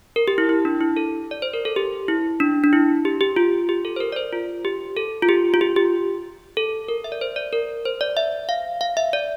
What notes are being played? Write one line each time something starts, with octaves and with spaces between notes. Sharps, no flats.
A#4
G4
E4
E4
D4
E4
A4
D5
C5
A#4
A4
G4
E4
D4
D4
E4
G4
G4
F4
G4
A4
C5
A#4
D5
C5
F4
G4
A4
F4
G4
F4
G4
G4
A4
A#4
E5
D5
C5
D5
A#4
C5
D5
E5
F5
F5
E5
D5